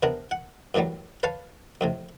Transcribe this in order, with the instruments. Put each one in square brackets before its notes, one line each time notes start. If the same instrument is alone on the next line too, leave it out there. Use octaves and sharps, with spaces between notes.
[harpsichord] C3 B3 D4 A#4
F#5
F#2 A2 E3 F#3 G3
B4 C#5 F5 A5
F2 A2 C3